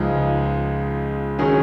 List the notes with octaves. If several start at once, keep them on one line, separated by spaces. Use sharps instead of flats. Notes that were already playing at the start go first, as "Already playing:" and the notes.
Already playing: C#2 C#3 F3 G#3 D#4
D#3 F#3 C#4 G#4